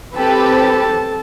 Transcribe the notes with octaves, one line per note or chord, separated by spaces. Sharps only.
C4 G4 A4 B4 A5